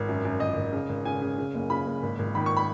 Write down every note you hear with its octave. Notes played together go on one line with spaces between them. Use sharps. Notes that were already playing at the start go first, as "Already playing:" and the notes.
Already playing: G#1
F#2
F#2
G#1 D#5
G#1
C#3
G#1
C#3 G#5
C#3
C#3
F#1
C#3 B5
F#1
G#1
G#1
D#3 B5
C#6
B5